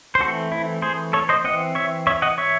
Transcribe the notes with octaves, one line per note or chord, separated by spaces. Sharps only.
C5
E3 A3 C4 F#4 A4
E4
G#4 C5
A4 C#5
C5 D#5
E3 C4 D#5 F#5
C#5 E5
C#5 E5
D#5 F#5
C#5 E5